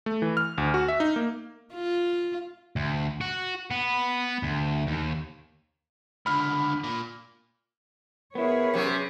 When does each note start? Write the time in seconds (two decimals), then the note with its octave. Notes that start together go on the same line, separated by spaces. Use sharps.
0.06 A3
0.22 E3
0.37 F6
0.58 D2
0.74 F#4
0.88 E5
1.00 D#4
1.16 A#3
1.74 F4
2.76 D2
3.21 F#4
3.71 B3
4.43 D2
4.87 D#2
6.26 C#2 D3 B5 F6
6.84 A#2
8.35 B3 E4 G#4 A#4 B4 C#5
8.74 C3 F#3 C#4